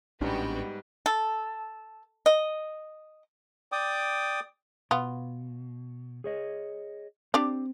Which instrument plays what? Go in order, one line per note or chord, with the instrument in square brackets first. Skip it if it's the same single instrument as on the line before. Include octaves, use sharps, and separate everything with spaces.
[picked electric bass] A1 C#4 D4 [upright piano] G#2 G3 [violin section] B3 F#4 G5
[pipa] A4
D#5
[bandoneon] D5 G5 D6 D#6
[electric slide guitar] B2 [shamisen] B3 F4
[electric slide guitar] G#4 C#5 D#5
[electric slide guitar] C4 [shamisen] D4 G4 D5